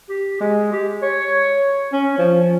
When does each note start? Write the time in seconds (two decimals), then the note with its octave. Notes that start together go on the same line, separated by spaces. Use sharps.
0.09 G4
0.41 G#3
0.73 G4
1.02 C#5
1.92 C#4
2.18 F3